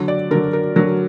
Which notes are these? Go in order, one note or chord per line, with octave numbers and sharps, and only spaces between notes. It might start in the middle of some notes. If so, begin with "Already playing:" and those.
Already playing: D3 F#3
D5
D3 F#3 A#4
A#4
D3 F#3 A#4